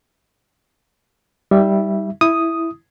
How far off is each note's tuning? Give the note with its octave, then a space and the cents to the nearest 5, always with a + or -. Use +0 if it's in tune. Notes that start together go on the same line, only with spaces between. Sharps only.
G3 +0 D#4 +35 E5 +5
E4 +0 D#6 +0